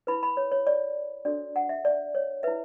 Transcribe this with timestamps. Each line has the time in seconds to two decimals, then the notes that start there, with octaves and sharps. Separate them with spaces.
0.07 E4 B4 B5
0.23 B5
0.37 C#5
0.52 C#5
0.67 D5
1.25 D4 F#4 A4 D5
1.56 F#5
1.69 E5
1.85 D5
2.15 C#5
2.43 E4 B4 E5